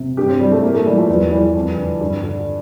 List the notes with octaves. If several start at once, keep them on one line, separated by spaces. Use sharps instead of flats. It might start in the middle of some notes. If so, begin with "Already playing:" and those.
Already playing: C3
G2 G4
C4
E3 G3
A3
A2 A#3
A3
E3 G3
F3
E2 G3
E3 G3
F2
D3
G2
D3